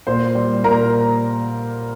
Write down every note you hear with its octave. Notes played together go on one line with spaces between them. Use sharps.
A#2 C5 C6
G3
A#2 A#4 A#5